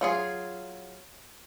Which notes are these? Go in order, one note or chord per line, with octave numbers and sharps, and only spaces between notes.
F#3 F4 G#4